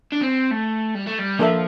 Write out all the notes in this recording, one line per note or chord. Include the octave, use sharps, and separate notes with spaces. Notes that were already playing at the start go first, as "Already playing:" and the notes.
D4
C4
A3
G3
A3
G3
F3 A#3 D4 A4 E5